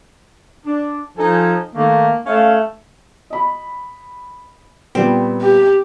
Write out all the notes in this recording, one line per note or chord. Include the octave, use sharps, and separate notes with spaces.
D4
F3 D#4 A4 G#5
D#3 A3 A#3
A3 C#4 F5
D#5 B5
A#2 G3 B3 C4
G4